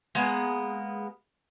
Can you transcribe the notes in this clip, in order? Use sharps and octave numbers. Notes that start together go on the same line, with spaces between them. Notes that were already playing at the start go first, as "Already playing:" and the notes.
G#3 A#3 B3 A#4